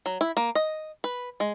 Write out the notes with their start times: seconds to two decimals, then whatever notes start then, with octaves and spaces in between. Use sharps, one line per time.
0.06 F#3
0.21 E4
0.37 A#3
0.55 D#5
1.04 B4
1.40 G#3